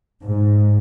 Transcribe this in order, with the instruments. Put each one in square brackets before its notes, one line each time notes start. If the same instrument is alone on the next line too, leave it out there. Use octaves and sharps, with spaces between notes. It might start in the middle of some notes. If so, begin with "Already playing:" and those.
[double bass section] G#2